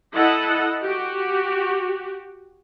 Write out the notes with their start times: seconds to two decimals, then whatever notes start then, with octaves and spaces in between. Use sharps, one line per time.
0.14 E4 A4 D#5 F#5
0.82 F#4 G4